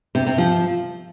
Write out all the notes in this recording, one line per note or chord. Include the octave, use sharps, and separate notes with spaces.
C3
C3
F3